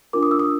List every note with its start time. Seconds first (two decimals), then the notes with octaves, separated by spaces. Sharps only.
0.13 D4 F4 A#4 D6
0.23 D#6
0.31 E6
0.39 D#6